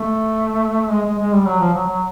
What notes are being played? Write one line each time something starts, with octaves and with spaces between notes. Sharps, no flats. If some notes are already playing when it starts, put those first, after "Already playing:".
Already playing: A3
G#3
G#3
G#3
G3
F#3
F3
F#3
F#3